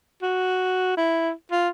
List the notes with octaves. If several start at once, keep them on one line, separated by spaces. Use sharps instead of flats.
F#4
E4
F4